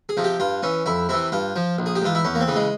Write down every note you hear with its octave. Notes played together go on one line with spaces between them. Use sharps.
G#4
C3 F3
G4
G2 F4
E3 C#4
F2 E4
C3 E3 E4
G2 F4
F3
A#1
G#4
G4
G#2 E3 F4
E4
E2 C#4
A#3
C4
C#3 E3
G#3